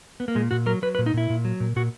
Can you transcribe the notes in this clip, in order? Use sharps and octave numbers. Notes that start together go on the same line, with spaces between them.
B3
A#3
A#2 G#3
A#2 F#4
F#3 A#4
F#3 B4
B4
A#2
D#4
A#2 E4
A#2
F#3
A#2
A#2 F#4